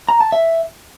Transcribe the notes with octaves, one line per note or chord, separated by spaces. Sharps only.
A#5
A5
E5